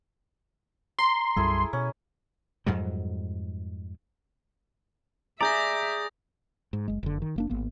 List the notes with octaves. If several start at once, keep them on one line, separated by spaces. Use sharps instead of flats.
A#5 C6
B1 F#2 G3 E4 G#4 A4
B2 C#4
F2 G#2 F#3 G3
G#4 D5 E5 A#5 D#6 G6 A#6
G#2
F#1 G#3
F#1 D3
D#3
F#1 A#3 D4
G#1 A#3 B3